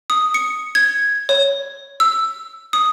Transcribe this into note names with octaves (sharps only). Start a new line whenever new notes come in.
D#6
C#7
G#6
C#5
E6
D#6